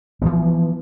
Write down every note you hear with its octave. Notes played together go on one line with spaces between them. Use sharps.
E3 F3 B3